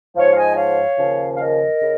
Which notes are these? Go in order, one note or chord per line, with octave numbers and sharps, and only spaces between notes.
G#2 F3 C#5 F5
F5
D#5 G#5
C#5 F5
D#2 C#3 F3
F5
A#4 D#5
C#3